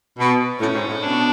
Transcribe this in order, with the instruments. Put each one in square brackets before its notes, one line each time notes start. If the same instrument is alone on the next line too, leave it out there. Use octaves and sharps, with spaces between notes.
[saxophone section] B2
[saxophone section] A2 [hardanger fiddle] C#4
[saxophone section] G#2
A2
[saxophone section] B2 [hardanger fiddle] D4